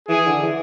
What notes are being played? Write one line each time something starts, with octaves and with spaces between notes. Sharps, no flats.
E3 G#4
D3
E3